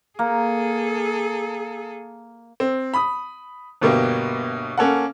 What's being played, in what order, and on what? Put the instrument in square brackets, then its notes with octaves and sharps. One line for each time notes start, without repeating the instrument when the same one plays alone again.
[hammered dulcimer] A#3 [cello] G#4 A4
[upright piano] C4
B5 D#6
G1 B2 A#3 G4
A#3 C#4 A4 F#5